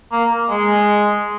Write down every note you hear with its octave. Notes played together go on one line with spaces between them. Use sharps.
A#3
G#3